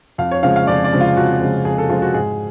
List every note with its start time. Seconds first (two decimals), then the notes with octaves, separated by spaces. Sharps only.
0.18 F2 F5
0.31 C#5
0.43 C#3 F3 G#3 F5
0.56 F5
0.67 F2 D5
0.84 D5
0.93 C#3 F3 G#3
1.00 F4
1.16 F2 F#4
1.42 C#3 F3 G#3
1.65 F2 G#4
1.78 A4
1.89 C#3 F3 G#3 F4
2.02 F#4
2.14 G#2 G#4